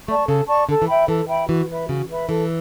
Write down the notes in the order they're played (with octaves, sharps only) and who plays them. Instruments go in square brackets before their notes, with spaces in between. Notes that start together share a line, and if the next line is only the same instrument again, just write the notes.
[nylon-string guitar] A3 [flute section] D5 A5 C#6
[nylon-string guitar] C#3 [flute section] A4
[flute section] D5 A5 C#6
[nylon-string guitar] D3 [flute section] A4
[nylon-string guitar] E3
[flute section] E5 G5 B5
[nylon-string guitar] E3 [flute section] A4
[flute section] E5 G5 B5
[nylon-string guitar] E3 [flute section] F#4
[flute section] B4 E5 B5
[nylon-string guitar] C#3 [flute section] F#4
[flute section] B4 E5 B5
[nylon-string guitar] E3 [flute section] A4